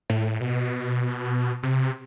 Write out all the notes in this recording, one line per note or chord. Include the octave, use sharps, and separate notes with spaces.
A2
B2
C3